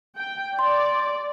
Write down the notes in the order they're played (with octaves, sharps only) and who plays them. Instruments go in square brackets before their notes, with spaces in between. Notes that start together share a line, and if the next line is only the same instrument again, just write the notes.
[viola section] G5
[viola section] D5 [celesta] C6